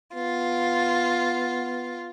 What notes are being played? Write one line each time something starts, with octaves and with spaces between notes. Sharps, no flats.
B3 F4